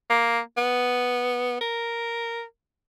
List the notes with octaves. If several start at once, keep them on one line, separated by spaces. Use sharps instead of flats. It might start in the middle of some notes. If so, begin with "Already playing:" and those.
A#3
B3
A#4